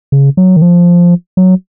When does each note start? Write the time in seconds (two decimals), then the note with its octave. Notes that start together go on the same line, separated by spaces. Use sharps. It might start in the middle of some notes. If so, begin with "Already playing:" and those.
0.12 C#3
0.37 F#3
0.57 D#3
0.62 F3
1.37 F#3